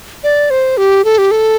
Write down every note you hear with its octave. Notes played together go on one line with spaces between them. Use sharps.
D5
C5
G4
A4
G4
A4